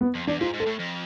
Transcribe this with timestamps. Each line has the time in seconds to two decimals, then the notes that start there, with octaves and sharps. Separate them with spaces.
0.01 B3
0.15 F2
0.27 E2 D4
0.40 G#2 F4
0.54 G#2
0.60 A4
0.67 A2
0.79 F2